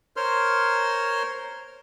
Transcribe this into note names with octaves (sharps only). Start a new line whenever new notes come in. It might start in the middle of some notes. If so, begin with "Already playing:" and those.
A#4 C5 C#5 C6 F6